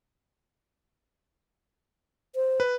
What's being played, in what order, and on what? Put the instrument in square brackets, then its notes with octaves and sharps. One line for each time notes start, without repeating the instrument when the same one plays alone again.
[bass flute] C5
[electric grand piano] B4